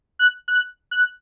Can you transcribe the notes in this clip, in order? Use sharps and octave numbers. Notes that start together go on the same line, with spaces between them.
F#6
F#6
F#6